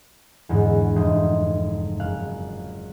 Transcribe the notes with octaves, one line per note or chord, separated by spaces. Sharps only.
E2 G#2 D3
F1 C5 D#5
F#1 F5 F#6